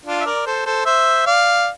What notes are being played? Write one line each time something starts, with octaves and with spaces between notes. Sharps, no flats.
D4 F4
E5
A#4 D5
A4 C5
A4 C5
C5 E5
D5 F5